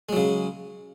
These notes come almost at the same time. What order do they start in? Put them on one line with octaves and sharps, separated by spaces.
G#3 F#3 C#3